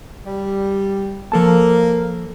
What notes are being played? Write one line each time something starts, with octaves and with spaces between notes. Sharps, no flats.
G3
F3 A#3 A4 A5